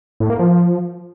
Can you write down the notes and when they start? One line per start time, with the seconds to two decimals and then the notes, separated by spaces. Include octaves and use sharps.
0.20 A2
0.30 A#3
0.39 F3